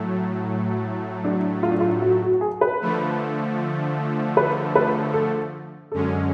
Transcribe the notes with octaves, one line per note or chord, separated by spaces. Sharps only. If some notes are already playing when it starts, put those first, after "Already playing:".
Already playing: A2 F#3 A3
D4
F4
D4
F4
F#4
F#4
G#4
B4
D3 F3 A3
B4
B4
A4
F#2 D3 G#3 C#4 A4